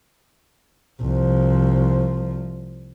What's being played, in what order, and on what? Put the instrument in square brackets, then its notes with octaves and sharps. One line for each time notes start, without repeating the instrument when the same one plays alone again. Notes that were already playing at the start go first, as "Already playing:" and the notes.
[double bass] C2 F3